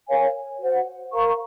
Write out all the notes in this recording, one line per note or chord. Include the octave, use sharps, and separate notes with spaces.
A#4 C#5 F5 G#5
F#4 C5 F#5
A#4 F5 A#5 C#6